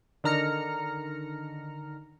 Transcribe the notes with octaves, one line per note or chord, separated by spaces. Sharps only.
D3 D#3 A#5 F6 A#6 C#7